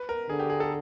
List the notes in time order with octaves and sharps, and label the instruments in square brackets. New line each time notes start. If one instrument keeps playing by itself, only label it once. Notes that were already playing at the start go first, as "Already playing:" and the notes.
Already playing: [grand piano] B4
A#4
[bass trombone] D3 [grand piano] G#4
[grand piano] G4
G#4
A4